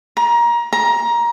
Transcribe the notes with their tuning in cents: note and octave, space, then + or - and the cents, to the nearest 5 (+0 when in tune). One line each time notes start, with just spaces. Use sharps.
A#5 +25
A#5 +20